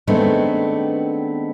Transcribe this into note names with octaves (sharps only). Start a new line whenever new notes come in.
D#3 G#3 A3 B3 C4 D4